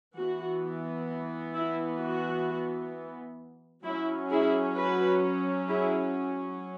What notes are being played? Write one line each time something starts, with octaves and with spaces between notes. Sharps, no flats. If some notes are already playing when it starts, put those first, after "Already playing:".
E3 B3 F#4
E4
F#4
F#3 C#4 E4
E4 G#4
F#4 B4
E4 G#4